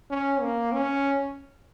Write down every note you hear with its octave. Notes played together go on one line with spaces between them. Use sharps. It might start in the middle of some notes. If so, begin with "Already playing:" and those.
C#4
A#3
C#4